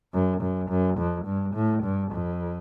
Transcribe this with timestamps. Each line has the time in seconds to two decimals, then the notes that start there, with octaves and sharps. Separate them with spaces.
0.14 F#2
0.41 F#2
0.70 F#2
0.98 F2
1.26 G2
1.54 A2
1.83 G2
2.11 F2